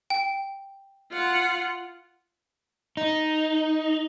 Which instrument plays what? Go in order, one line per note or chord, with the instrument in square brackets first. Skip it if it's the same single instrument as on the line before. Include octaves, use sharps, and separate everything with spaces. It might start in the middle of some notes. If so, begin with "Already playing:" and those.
[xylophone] G5
[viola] F4 F#5
[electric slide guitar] D#4